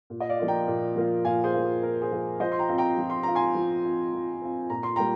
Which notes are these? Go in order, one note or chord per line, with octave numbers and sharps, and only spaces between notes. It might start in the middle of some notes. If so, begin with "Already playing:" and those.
A#2
D#5
D5 F5
F3 A#3 F4
G5 A#5
A#2
F3 A#3 F4
A#2 F5 G#5
G#4 C5
F3 A#3 F4
G#4
A#2 A#4
G#4 C5
F3 A#3 F4
F3 C5 D#5
C6
G5 A#5
C4 F4
G5 A#5
F3
C6
C4 F4 A#5
G#5 C6
F3
C4 F4
F3
C4 F4
A#2 A#5
C6
G3 A#3 G5 A#5